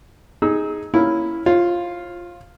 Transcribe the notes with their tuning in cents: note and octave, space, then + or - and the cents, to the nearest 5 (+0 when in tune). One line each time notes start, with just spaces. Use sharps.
D#4 +5 G#4 +0 E6 -35
A#3 +0 C#4 +0 E4 +0
F4 +0 C#5 -45